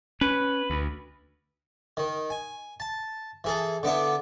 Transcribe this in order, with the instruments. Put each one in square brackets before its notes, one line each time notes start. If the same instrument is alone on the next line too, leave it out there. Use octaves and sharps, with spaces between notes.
[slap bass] C#4 [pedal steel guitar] B4
[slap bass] D2
[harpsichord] D#3
G#5
A5
E3 G#4 A4
D3 B3 D4 E4